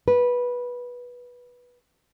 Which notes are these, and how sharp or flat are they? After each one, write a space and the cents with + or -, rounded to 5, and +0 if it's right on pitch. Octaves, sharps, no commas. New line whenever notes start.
B4 -15